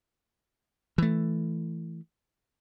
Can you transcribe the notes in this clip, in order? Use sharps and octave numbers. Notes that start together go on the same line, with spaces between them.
E3 A3